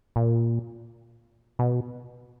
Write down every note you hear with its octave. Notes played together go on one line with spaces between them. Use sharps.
A#2
B2